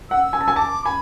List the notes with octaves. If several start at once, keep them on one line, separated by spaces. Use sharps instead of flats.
F#5 E6
G#5
A5
G#5
A5 D6
G#5 B5